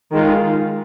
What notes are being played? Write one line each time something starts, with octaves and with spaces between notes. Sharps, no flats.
D#3 G#3 F4